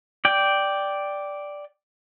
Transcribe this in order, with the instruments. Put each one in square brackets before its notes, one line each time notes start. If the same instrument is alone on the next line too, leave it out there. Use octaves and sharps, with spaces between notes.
[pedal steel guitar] D5 G5